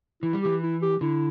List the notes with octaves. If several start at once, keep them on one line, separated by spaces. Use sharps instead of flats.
E3 E4
G3
E3 G4
E4
G4
D3 E4